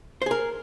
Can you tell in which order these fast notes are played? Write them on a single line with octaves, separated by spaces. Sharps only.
C5 G#4 A#4